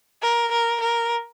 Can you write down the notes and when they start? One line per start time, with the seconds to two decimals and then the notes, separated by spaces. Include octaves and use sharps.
0.22 A#4
0.52 A#4
0.81 A#4